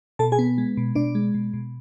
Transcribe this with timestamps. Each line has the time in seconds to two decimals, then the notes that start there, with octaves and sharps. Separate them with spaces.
0.19 B2 A4 A5
0.32 G#4 G#5
0.39 B3
0.58 G#3
0.77 B2
0.95 B2 D4 D5
1.15 G#3
1.34 B2
1.53 B2